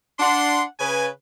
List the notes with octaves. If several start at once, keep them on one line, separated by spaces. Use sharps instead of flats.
D4 F#5 C6
C#3 B4 G#5